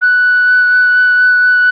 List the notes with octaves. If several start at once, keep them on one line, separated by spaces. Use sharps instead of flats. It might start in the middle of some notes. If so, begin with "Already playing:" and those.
F#6